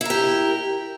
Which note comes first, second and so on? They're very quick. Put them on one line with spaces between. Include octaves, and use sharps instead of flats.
E4 A#4 G4